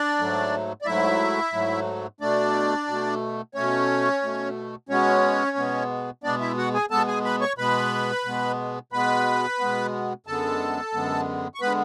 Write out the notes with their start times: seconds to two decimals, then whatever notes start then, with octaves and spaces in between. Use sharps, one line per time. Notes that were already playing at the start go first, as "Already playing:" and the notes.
Already playing: D4 D5
0.19 G#2 F#3 A3
0.82 D5
0.86 G#2 F#3 A3 E4 E5
1.53 G#2 F#3 A3
2.21 B2 A3 D4 D5
2.88 B2 A3
3.54 B2 A3 C#4 C#5
4.22 B2 A3
4.89 B2 G#3 B3 C#4 C#5
5.57 B2 G#3 B3
6.23 B2 G#3 B3 D4 D5
6.40 E4 E5
6.57 F#4 F#5
6.74 G#4 G#5
6.91 B2 G#3 B3 A4 A5
7.07 G#4 G#5
7.24 B4 B5
7.41 C#5 C#6
7.58 B2 G#3 B3 B4 B5
8.25 B2 G#3 B3
8.92 B2 G#3 B3 B4 B5
9.59 B2 G#3 B3
10.26 F#2 D3 G#3 B3 A4 A5
10.94 F#2 D3 G#3 B3
11.54 C#6
11.61 D3 G#3 B3 B4 B5